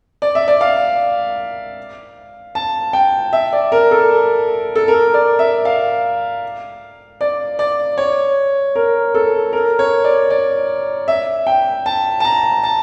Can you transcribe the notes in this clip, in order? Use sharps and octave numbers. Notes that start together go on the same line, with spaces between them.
D5
E5
D5
F5
A5
G5
E5
D5
A#4
A4
A4
A#4
D5
E5
F5
D5
D5
C#5
A#4
A4
A#4
C#5
D5
D5
E5
G5
A5
A5
A#5
A5